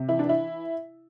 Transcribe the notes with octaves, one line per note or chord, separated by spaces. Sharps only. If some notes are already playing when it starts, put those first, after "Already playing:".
Already playing: C3
E3 E4
D4
E3 E4